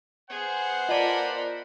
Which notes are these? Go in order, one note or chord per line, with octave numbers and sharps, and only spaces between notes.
B3 G#4 C5 F#5
F4 A#4 D5 D#5 A5 B5